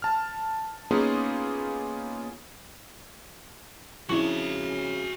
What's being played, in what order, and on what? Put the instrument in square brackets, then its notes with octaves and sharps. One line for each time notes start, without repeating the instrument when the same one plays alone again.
[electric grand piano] A5 F6
A#3 B3 C#4 D#4 F4 G#4
[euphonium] C#3 [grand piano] F3 C4 D4 [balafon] E4 C#6 [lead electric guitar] F#4 E5